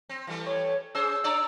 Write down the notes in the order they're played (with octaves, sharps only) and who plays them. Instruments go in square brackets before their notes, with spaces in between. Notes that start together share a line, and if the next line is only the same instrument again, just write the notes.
[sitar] C4
E3 G3 A3
[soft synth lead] C#5
[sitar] C#4 G#4 C5 [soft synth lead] E6
[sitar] D4 C#5 D5